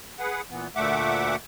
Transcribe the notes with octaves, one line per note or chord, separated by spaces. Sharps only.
G#4 B4 F#5
A#2 E3 B3
D2 A#2 A3 E5 F#5 D6